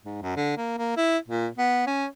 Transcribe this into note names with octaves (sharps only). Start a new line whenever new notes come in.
G#2
F#2
D3
A#3
A#3
E4
A#2
B3
C#4